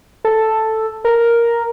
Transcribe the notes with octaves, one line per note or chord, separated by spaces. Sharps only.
A4
A#4